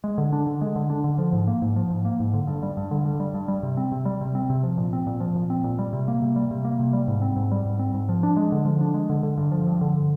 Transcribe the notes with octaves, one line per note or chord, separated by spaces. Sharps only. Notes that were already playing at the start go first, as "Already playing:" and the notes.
G#3
D3
D4
D3
G#3
D3
D4
D3
F3
G#2
A#3
G#2
F3
G#2
A#3
G#2
D3
G2
G3
G2
D3
G2
G3
G2
G3
C3
C4
C3
G3
C3
C4
C3
F3
A#2
C4
A#2
F3
A#2
C4
A#2
G3
C3
A#3
C3
G3
C3
A#3
C3
G3
G#2
C4
G#2
G3
G#2
C4
G#2
F3
D4
G#3
D3
F3
D4
G#3
D3
D3
G2
F3
G2
D3